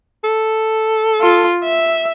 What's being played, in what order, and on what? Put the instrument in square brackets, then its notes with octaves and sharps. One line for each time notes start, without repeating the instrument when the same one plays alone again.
[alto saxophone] A4
[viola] F4
E5